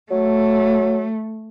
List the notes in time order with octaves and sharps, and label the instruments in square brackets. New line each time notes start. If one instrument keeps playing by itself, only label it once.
[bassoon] F#3 [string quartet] A3